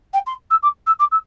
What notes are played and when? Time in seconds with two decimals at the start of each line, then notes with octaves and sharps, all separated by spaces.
0.13 G5
0.26 C6
0.50 E6
0.62 D6
0.86 E6
0.99 D6
1.11 E6